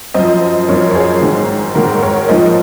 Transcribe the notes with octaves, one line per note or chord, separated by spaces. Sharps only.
F#2 F3 C5 D#5
F#2 F3 A#4 C#5
C#5
G#4 C5
G#2 D#3
G#2 D#3 F#4 A#4
A#4 C#5
G#2 F3 C5 D#5